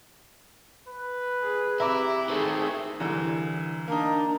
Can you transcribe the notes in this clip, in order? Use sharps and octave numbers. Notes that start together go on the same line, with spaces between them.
B4
G#4
C4 E4 G4 E5 A#5 D6
D#3 A3 C4 G#4
C2 D3 E3
A#3 D4 D#4 A5 A#5